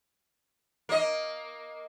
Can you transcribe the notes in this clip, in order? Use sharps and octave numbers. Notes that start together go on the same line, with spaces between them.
A#3 D#5